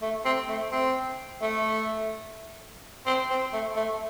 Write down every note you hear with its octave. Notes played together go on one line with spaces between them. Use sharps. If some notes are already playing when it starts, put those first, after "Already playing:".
A3
C4
A3
C4
A3
C4
C4
A3
A3